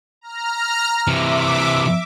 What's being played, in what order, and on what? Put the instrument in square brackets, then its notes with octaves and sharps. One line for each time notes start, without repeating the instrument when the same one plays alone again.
[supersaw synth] A#5 F6
[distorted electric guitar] C3 E3 [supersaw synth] E5 D6